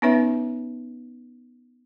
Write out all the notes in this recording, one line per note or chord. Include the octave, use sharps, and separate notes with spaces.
B3 C#4 D#4 B4 C#5 E5